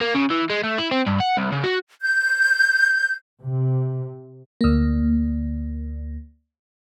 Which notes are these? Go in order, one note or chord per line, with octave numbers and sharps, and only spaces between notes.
A#3
C#3
E3
G#3
A3
E4
C4
G2
F#5
C2
C#3
F#4
G6
C3
D2 A#3